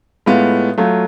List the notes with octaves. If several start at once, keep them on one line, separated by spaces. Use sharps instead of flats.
A2 G#3 B3 F4
F#3 A3 F4